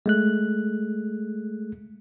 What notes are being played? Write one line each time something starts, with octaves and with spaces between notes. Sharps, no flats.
G#3 A3 F#6